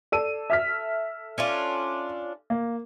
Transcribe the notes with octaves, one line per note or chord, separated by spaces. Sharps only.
A4 D5 E6 D#7
E5 F6 B6
C#4 D4 F4
A#3